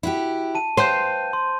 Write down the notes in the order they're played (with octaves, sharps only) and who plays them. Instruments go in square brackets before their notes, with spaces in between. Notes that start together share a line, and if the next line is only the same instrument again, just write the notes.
[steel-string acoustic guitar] E4 F#4 G4
[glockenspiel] A5 D#7
[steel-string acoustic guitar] B4 F5 G5 [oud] C5 [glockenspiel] G6 D#7
[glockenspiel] C6